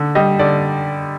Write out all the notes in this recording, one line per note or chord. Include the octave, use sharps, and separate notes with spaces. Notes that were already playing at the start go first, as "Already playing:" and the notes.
Already playing: D3
G3 D#5
D3 D5